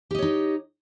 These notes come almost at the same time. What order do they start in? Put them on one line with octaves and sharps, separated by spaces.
G4 D#5 C#5 D#4